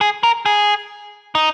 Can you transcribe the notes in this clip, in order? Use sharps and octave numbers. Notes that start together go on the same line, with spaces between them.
G#4
A#4
G#4
D#4